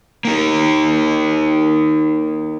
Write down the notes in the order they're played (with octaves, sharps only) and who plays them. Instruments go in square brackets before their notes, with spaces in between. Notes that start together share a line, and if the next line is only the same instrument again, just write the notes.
[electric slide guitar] A#3 D#4 A#4